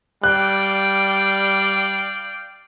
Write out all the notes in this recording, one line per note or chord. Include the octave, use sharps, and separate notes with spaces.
G3 D5 F5 G5 F#6